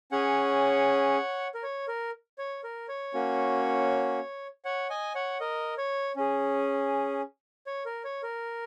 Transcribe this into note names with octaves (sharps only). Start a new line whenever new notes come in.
C#4 G#4 C#5 F#5
A#4
C#5
A#4
C#5
A#4
C#5
A#3 C#4 F#4
C#5 F#5
D#5 G#5
C#5 F#5
A#4 D#5
C#5
C#4 G#4
C#5
A#4
C#5
A#4